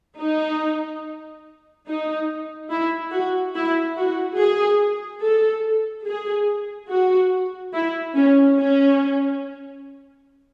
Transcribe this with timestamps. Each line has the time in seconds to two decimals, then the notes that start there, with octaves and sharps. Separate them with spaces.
0.20 D#4
1.87 D#4
2.71 E4
3.12 F#4
3.55 E4
3.97 F#4
4.38 G#4
5.23 A4
6.06 G#4
6.91 F#4
7.73 E4
8.15 C#4
8.58 C#4